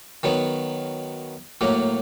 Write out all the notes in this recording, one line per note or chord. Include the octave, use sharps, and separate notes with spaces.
D#3 F#3 B3
A2 F#3 A#3